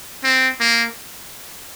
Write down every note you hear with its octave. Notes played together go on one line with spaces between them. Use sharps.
C4
A#3